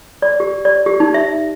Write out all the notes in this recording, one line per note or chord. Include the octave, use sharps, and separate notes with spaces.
D5
G4
D5
G4
D#4
E5